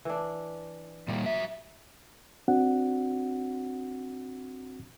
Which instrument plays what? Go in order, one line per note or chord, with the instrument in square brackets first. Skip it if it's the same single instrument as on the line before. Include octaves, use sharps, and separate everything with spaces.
[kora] E3 D4
[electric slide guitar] A#2 G3 A#3
F#3 E5
[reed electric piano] C4 D4 F#4 F#5